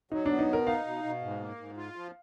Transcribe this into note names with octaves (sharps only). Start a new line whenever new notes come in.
F#3 D#4
B3 D4
D#4
B2 A#4
D#4 F5
B2
B2
G#2
A#3
G#2
F4
F3